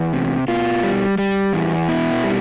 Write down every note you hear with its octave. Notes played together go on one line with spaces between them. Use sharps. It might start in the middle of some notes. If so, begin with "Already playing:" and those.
Already playing: E2
C3
B2 F4
G3
G3
E2
B2 E4
G3